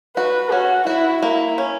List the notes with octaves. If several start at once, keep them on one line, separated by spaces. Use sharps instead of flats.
F#4 B4
C#4 F#4
E4 F#4
A#3 E4
C#4